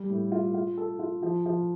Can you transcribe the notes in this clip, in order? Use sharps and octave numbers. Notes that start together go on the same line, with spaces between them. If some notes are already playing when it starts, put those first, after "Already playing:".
Already playing: G3
A2
F4
F4
A4
F4
F3
F3